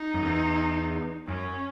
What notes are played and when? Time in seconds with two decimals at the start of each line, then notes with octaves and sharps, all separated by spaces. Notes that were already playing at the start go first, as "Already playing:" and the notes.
Already playing: D#4
0.14 F#2
0.23 E2
1.27 F#2 C#4